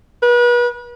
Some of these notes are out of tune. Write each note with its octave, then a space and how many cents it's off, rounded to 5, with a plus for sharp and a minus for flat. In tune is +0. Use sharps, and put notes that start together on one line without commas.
B4 -35